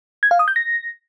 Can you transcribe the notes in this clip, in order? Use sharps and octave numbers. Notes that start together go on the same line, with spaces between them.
G#6
F5
D#6
G6
A#6